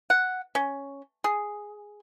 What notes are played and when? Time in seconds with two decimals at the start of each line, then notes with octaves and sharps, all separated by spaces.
0.10 F#5
0.55 C#4
1.24 G#4